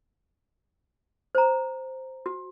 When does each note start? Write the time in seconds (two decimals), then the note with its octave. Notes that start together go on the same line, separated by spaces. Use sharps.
1.35 C5 A#5
2.26 F#4